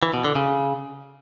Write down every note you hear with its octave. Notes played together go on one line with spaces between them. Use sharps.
E3
B2
D3
C#3